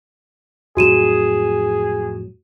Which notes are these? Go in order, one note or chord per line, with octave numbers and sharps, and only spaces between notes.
F2 A2 F#3 F#4 G#4 D#7 E7